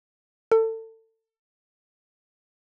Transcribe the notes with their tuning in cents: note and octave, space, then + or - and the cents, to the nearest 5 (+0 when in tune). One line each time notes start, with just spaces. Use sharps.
A4 +30